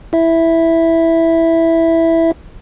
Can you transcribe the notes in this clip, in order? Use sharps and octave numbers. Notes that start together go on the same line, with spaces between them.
E4 E5